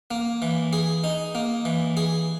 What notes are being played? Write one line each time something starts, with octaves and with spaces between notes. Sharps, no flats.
A#3
E3
G#4
D#4
A#3
E3
G#4